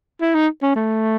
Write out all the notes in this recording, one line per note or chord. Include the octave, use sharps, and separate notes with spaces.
E4
D#4
C#4
A3